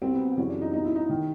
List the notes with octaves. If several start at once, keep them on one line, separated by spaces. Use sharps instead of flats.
C2 B2 C4
B3
F#2 C#3 E3 C#4
D4
D#4
C2 B2 D#4
E4
D#4
D#3